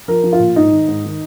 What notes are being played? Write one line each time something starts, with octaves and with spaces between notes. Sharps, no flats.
F3 A#4
F3
F4
A#2
G#2 D#4
D#3
G#2
D#3